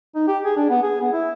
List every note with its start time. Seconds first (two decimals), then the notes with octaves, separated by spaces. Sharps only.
0.15 D#4
0.28 G4
0.45 G#4
0.57 D4
0.70 B3
0.83 G#4
1.01 B3
1.13 E4